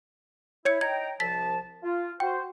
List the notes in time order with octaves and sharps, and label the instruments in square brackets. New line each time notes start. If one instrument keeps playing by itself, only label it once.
[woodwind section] E4 [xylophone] C#5 G#6 C#7
[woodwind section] D#4 G5 A#5 [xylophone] G#6
[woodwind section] C2 F3 A5 [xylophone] A6 B6
[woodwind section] F4
[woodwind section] F#4 C5 [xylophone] G5